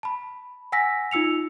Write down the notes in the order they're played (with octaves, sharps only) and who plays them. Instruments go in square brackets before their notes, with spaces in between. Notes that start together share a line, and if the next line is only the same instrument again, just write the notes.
[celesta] A5 B5
F#5 G#5 E6 A#6 B6
D#4 F4 E6 C#7 F7